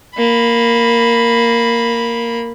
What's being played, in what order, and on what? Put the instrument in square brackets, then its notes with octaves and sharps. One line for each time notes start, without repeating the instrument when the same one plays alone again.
[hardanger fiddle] A#3 B5